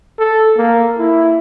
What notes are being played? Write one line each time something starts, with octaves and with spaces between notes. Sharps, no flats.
A4
A#3
E4